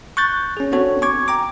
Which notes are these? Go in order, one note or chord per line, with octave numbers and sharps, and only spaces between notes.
C#6 F#6 G6 A6
C#4 G#4
B3 C4 D4 F#4 A4 C#5
G#5 C#6 D6 G#6
G5 A#5 D6